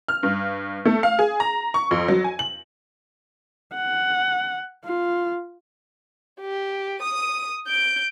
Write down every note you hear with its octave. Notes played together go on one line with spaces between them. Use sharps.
F6
G2
A3
F5
G#4
A#5
C#6
F2
F#3
G#5
F#7
F#5
F4
G4
D#6 D#7
G6 D7